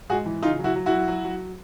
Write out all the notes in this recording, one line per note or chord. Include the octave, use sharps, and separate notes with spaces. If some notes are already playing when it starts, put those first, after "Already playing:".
G#2 F#4 G#4
E3
C#3 D#4 F4
F#3
E4 F#4
F#3
E4 F#4
F#3
F#3
F#3